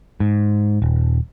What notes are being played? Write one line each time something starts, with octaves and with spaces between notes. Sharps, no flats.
G#2
D#1